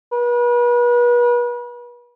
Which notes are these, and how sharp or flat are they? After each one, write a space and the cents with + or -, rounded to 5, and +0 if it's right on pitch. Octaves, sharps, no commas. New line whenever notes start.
B4 -40